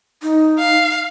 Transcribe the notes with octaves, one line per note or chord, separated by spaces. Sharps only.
D#4
F5